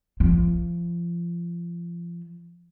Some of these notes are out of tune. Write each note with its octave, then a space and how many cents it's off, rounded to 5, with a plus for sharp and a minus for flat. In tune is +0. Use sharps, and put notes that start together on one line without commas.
F3 -25